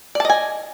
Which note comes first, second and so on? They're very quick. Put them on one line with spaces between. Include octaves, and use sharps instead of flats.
D5 A5 D#5 G#5